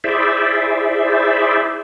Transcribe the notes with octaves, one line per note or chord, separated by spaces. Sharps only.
E4 G#4 C5 D5 E5